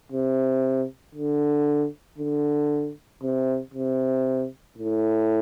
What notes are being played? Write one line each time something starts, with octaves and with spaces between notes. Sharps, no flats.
C3
D3
D3
C3
C3
A2